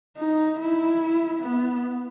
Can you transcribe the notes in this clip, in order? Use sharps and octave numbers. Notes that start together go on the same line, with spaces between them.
D#4
E4
B3